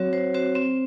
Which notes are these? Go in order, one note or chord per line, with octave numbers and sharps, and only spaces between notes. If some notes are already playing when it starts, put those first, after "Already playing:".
Already playing: F#3 C4 F#4 C#5
F#3 C5
C4 F#4 C5
C4